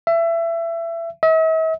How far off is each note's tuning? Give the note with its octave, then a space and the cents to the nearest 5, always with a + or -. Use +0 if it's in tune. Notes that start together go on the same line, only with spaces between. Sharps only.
E5 +25
E5 -45